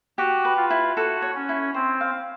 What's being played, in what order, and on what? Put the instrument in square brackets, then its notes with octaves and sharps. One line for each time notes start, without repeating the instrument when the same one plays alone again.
[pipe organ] F#4 [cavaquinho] G4
[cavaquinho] B4
[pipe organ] F4
[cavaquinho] E4
[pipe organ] F#4 [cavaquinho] A4
[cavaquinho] C#5
[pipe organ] C#4
[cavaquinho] E4
[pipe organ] C4 [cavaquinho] C5
[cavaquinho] F5